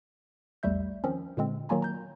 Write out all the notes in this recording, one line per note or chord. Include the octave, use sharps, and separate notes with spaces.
A#1 E2 G3 A3 E5 G6
D#3 F3 C4 C#4
A#2 D3 G#3 C4
D#3 F#3 A#3 F4 G#5 A#5
A#5 G6